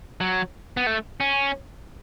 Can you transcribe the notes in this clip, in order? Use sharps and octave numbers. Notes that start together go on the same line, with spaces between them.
F#3
B3
A3
C#4